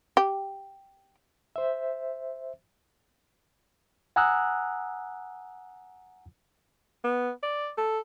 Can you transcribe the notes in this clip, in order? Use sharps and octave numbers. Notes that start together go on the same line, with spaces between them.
G4
C5 E5
F#5 G#5 A#5 D#6 E6 F#6
B3
D5
A4